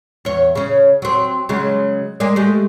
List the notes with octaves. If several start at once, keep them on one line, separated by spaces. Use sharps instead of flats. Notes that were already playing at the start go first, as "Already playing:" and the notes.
E2 C#5
C#3 C#4
F#3 C4
C#3 F#3 G#3
G#3 A#3 D5
G#3 A3 G4